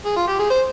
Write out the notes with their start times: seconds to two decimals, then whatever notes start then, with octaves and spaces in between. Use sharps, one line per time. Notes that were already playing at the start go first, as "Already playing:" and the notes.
0.05 G#4
0.16 F4
0.27 G4
0.39 G#4
0.50 C5